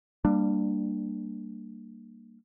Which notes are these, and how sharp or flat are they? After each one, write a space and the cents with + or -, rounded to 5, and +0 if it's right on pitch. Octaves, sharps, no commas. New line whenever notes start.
G3 +0 A#3 -15 D4 +20